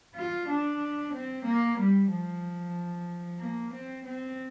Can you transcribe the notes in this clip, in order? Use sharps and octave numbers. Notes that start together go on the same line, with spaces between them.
F4
D4
C4
A#3
G3
F3
A#3
C4
C4